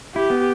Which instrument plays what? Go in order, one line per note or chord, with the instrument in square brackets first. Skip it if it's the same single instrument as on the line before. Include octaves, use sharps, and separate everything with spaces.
[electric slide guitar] E4 [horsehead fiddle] G4
[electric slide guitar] B3